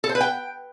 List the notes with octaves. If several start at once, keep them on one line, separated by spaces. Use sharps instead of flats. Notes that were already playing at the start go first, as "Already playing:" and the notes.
A4
C5
B4
G5